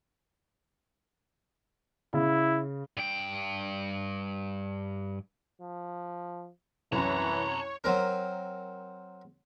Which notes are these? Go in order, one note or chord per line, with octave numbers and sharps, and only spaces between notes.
C#3 E4
G2 G5
F3
C2 F#2 E3 C#5 A5 A#5
F#3 C4 A#4